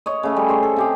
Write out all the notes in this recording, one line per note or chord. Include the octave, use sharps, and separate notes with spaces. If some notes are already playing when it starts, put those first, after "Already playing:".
C#5 D#5
C#3 A3
G3
G#4 C5 C#5
A4
C3 G4 G#4